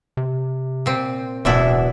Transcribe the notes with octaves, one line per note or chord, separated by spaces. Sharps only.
C3
A#2 C4
D1 E2 B2 E3 D4 E4 E5